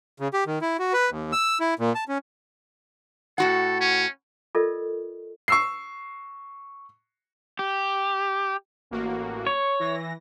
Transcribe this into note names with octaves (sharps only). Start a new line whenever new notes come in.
C#3
G4
D#3
E4
F#4
B4
D#2
E6
E4
A#2
A5
C#4
A2 F#4 A4 F#5
C#4
F4 A4 A#4 D5 D#5
C#6 E6 C7
G4
A1 A#3 F#4
C#5
E3 A#6